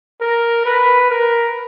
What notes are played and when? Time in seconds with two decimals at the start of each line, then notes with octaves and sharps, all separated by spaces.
0.21 A#4
0.66 B4
1.10 A#4